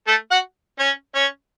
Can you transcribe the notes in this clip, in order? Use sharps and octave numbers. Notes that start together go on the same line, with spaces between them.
A3 A4
F#4 F#5
C#4 C#5
C#4 C#5